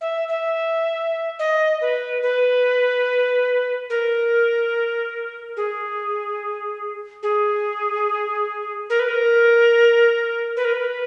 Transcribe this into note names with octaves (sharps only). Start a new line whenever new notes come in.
E5
E5
D#5
B4
B4
A#4
G#4
G#4
A#4
B4
A#4
B4
A#4
B4